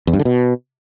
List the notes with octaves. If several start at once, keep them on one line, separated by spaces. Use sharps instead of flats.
E2
G2
D3
B2